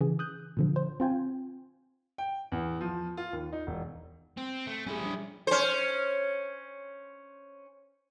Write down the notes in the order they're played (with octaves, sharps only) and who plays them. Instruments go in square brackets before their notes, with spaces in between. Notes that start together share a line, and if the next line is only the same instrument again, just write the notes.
[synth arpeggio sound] C#3 E3 G#4
D#6 F#6 G6
A#2 D3 F3
C5
C4 F4 G5 G#5
[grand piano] G5
E2
F3
F4
D#2
D#4
E1
[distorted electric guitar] C4
A3
[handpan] G3 G4 G#4 [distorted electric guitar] C#4 E4
[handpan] F3 G3 D4
[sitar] C#4 C5